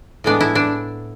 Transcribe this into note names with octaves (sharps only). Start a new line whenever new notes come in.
A2 G#3 B3 D4
E4
D4